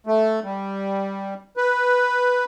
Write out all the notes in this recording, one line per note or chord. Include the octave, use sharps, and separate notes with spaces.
A3
G3
B4